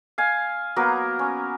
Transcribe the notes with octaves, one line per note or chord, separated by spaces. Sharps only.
F5 G#5
F#3 A#3 B3 A#4
C#4